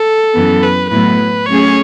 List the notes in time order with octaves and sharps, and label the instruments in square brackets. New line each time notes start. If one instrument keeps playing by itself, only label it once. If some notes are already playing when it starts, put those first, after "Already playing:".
Already playing: [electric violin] A4
[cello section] F#2 E3 B3
[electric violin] B4
[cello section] A2 F#3 B3 E4 [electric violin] B4
[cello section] F#3 A3 C#4 G#4 [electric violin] C#5